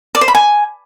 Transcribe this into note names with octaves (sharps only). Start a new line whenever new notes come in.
D5
C5
B5
G#5